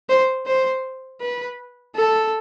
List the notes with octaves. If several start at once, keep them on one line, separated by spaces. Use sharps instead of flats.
C5
C5
B4
A4